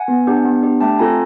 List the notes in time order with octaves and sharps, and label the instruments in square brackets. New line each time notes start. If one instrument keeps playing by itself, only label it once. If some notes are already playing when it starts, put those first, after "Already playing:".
Already playing: [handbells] F#5 G#5
B3
D4 G4
B3
D4 G4
A3 G5 A5
C4 F4 A4 G#5 A#5